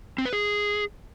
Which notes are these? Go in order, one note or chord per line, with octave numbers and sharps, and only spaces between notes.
C4
B4
G#4